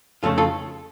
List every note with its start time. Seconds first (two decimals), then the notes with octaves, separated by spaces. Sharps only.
0.23 F2 C#3 A3 F4 A4
0.38 F4 A4